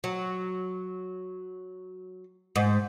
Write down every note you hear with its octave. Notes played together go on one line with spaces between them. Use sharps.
F#3
G#2